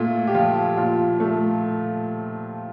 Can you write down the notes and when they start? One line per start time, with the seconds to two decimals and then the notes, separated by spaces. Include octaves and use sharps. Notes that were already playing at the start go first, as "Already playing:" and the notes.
Already playing: A#2 A3 F4
0.27 G4
0.34 F3 F4
0.77 A#2 F4
1.20 A3